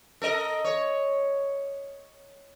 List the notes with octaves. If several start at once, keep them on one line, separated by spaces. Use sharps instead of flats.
A4 A#4 D#5
C#5